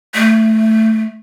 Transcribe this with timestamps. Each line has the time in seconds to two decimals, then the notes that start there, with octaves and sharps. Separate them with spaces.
0.14 A3